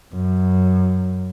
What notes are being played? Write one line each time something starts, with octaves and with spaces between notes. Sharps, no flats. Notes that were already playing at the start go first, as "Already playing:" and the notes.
F#2